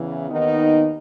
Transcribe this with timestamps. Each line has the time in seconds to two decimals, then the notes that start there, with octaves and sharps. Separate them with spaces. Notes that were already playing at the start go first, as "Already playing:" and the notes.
Already playing: E2 C#3 E3
0.30 D#2 D#3 B3 D#4